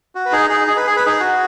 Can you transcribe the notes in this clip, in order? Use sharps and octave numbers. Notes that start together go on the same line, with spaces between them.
F#4
B4
D#4 G#4
D#4 G#4
G#4
B4
G#4
B4
D#4 G#4
F#4